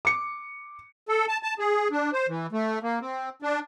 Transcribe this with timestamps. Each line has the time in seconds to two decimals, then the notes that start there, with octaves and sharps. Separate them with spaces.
0.05 D6 C#7
1.09 A4
1.28 A5
1.43 A5
1.59 G#4
1.92 D4
2.13 C5
2.29 E3
2.52 A3
2.83 A#3
3.01 C4
3.42 D4